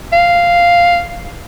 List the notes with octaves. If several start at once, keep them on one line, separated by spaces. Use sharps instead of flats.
F5